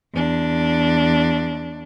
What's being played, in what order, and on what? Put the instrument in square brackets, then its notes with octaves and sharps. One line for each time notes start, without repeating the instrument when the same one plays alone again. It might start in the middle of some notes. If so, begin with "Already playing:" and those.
[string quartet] E2 D4